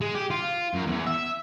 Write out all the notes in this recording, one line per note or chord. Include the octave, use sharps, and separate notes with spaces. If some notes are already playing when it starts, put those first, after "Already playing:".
G#3
G4
F4
F#2
E2
E5